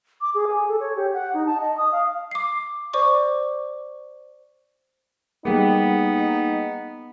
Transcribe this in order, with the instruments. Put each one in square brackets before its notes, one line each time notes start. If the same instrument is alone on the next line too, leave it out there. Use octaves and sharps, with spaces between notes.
[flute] D6
G#4
G#5
A4
C#5
G4
F#5
D#4
A5
D#5
D#6
F5
[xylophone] D6 C7
C5 D5 C#6 D6
[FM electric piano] G3 A#3 [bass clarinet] B3 [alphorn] D#4 [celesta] G#4 F#5 G5